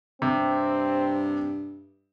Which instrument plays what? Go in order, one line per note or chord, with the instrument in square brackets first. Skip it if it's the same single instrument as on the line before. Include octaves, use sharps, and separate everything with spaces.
[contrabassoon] G2 [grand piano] C3 [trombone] C4